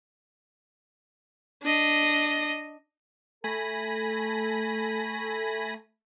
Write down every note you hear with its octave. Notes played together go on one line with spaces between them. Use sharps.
D4 D#5
A3 A4 G#5 B5 A#6